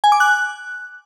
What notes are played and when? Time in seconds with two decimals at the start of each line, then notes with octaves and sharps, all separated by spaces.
0.04 G#5
0.12 D6
0.20 F#6